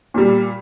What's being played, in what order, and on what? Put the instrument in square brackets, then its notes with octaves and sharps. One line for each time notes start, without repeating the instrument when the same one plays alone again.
[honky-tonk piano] A#2 G3